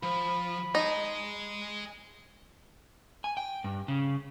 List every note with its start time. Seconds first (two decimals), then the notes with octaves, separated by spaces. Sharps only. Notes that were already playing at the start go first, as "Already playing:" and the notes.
0.03 F3 B5
0.75 D#4 D#5 G#5
3.24 G#5
3.37 G5
3.64 G2
3.88 C#3